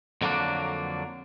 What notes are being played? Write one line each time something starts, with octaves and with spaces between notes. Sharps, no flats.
F2 D3 F#3 A#3 D4